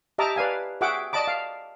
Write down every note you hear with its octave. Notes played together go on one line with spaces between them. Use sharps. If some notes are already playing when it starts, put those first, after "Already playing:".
G4 D#5 E5 A5 A#5 D6
B4 D5 F5 G#5
F#4 G#4 E5 F#5 G5 D6
D5 D#5 A5 B5 D6
F5